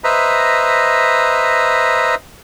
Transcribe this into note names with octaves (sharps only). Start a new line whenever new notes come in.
B4 C5 D#5 E5 A#5